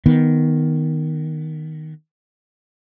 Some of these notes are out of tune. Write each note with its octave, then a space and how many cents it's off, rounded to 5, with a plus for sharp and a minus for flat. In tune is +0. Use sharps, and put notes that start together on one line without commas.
D#3 +0 B3 +0